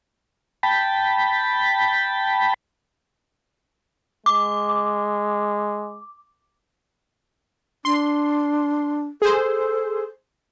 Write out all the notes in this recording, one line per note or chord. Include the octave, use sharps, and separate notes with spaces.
G5 A5 B5
G#3 D6
D4 C6
G#4 A4 C5